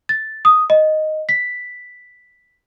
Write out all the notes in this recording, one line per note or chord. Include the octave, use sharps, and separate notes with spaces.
A6
D#6
D#5
B6